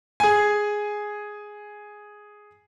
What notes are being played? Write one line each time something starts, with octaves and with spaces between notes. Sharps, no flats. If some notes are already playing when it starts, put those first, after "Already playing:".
G#4 G#5